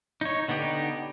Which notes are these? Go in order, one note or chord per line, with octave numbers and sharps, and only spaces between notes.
D#4 C#5
D3 B3 D#4 G4